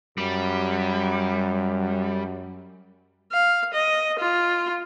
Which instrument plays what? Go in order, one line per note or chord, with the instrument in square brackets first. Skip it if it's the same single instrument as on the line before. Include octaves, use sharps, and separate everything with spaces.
[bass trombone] F#2 [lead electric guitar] G3
[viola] F5
D#5
F4